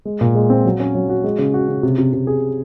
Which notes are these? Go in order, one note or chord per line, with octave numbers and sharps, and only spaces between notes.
G#3
A#2
G#3
C4
F#3
C#4
F#3
F#4
G#3
C#3
F#4
C#3
C3
C3
C3
G#4